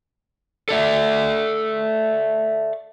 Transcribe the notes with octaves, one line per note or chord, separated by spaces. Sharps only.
A4 D5 E5